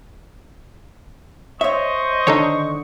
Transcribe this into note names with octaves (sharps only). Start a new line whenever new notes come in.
C5 C#5 D#5 E5 C#6
D3 D#3 D#4 A4 C#5